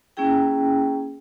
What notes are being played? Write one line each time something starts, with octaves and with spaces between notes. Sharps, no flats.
A#3 C#4 E4 G#4 G5